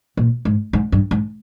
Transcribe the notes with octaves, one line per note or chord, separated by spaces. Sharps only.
A#2
G#2
G#2
G2
G#2